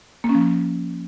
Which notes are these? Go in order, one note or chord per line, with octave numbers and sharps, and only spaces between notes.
A#3
C#4
F3